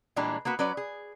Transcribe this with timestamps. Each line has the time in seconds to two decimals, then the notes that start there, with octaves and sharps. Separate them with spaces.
0.16 A#2 E3 G3 G#3 D4 A#5
0.45 A#3 B3 F#4 B4
0.59 F#3 C#4 B4 D5
0.77 G#4